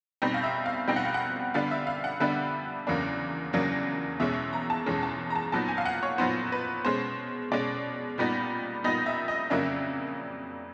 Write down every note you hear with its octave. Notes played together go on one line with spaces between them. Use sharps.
B2 G3 C4 D#4
F5
E5
F5
B2 G3 C4 D#4 G5
F#5
F5
F#5
D3 G3 B3 D4 F5
E5
F5
F#5
D3 G3 B3 D4 E5
E2 C#3 F#3 A#3 D4
E2 C#3 F#3 A#3 D4
E2 B2 G#3 C#4 E5
A#5
A5
E2 B2 G#3 C#4
A5
A#5
A5
A#2 F#3 B3 D#4 A5
G#5
F5
F#5
C#5
A#2 F#3 B3 D#4 C5
B4
B2 G#3 C#4 C5
B2 G#3 C#4 D5
A#2 G3 B3 D#4
A#2 G3 B3 D#4 D#5
E5
D#5
F2 C#3 F#3 A#3 D4 E5